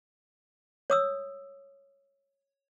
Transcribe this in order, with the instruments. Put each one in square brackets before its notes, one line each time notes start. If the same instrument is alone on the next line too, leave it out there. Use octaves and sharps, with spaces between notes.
[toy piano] C#5 D#6 E6